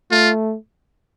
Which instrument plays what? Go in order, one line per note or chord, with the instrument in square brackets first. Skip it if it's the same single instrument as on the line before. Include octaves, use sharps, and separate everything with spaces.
[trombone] A3 [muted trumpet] F4